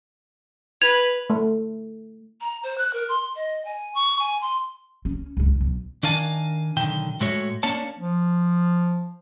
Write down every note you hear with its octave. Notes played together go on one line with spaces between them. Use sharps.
B4 G#6 F7
A3
A#5
C5
F#6
A#4
C6
D#5
G#5
C#6
G#5
C6
C#4
C#2 G2
B1
D#3 D4 A#4 F5 G#5 A5
B1 D3 D#3 G5
A2 G#3 A3 F#4 C#5
A#3 C#4 D4 C#5 A5
F3